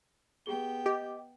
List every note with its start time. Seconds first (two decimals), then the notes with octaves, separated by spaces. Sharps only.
0.46 B3 G4 G#4 G5 G7
0.86 G4 D#5